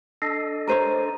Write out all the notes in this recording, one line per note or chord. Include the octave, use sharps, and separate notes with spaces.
D4 A4 D#5 C7
A#4 C5 C#5 A#5 D#7